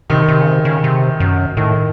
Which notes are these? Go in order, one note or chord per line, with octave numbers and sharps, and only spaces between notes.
C3 D#3
C3
C#3
C3
C#3
C3
F#2
A2 D#3